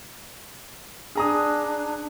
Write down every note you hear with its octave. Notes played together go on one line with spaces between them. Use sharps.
D4 G#4 A#5 D#6